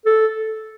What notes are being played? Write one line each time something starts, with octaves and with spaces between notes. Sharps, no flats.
A4